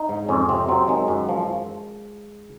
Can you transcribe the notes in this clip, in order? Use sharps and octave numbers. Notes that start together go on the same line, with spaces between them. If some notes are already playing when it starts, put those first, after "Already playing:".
Already playing: D#4
G#2
F2 C#4
C3 C4
F#3 C4
D#3 G#3
F#2
F3